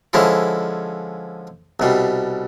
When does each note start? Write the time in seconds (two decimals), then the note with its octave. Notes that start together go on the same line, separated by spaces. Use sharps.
0.13 D3 F3 G#3 C#4 E4
1.80 C2 B2 G3